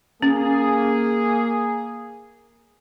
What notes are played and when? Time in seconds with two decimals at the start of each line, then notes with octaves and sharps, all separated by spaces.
0.22 A#3 C#4 G#4